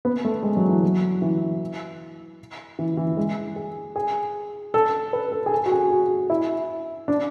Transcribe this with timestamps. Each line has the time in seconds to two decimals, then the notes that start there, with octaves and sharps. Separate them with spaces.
0.05 B3
0.25 A3
0.43 G#3
0.57 F#3
0.69 E3
0.83 F#3
1.22 E3
2.79 E3
2.97 E3
3.17 G#3
3.56 G#4
3.96 G#4
4.74 A4
5.13 B4
5.32 A4
5.46 G#4
5.51 A4
5.66 F#4
5.71 G#4
5.90 F#4
6.30 E4
7.08 D4